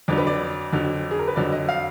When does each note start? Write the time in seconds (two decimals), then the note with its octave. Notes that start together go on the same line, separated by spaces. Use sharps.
0.08 F2 D3 F#3 D5
0.18 B4
0.27 D5
0.73 F2 D3 F#3
1.11 G#4
1.19 A#4
1.28 B4
1.36 F2 D3 F#3 D5
1.52 D#5
1.69 F5